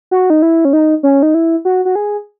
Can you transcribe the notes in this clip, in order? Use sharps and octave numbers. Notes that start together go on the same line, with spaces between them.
F#4
D#4
E4
C#4
D#4
C#4
D#4
E4
F#4
F#4
G#4